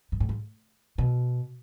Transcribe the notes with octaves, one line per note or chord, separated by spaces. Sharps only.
G#2
A2
G#2
B2